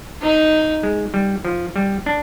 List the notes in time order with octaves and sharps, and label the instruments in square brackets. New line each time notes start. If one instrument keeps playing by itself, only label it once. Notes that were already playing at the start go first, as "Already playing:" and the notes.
[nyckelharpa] D#4
[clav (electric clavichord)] G#3
G3
F3
G3
D4